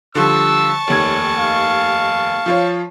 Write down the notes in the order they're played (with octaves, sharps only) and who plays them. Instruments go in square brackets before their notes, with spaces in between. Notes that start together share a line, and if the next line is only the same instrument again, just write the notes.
[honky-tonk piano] D3 F3 G3 [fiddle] A5 C#6 [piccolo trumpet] E6
[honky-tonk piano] F1 D#2 G#6 [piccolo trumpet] C#5
[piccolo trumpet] F5
[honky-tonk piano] F3 F4 C#5